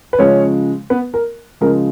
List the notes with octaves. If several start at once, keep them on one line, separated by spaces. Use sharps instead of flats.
B4
C#3 F3 G#3 C#4 C#5
B3 B4
A#4
C#3 F3 G#3 A#4